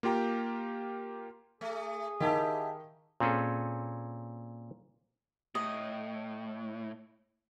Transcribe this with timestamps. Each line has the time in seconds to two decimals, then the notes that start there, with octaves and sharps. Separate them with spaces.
0.03 A#3 F4 G4 G5 A#5
1.61 A3 G#4
2.20 D#3 E4 G4 D#5 F5 A5
3.20 A#2 C4 C#4 G#4 A4
5.55 A2 D#5